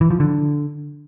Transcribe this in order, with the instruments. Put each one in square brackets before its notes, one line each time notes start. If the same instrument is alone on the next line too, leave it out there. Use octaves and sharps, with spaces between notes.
[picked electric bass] E3
F3
D3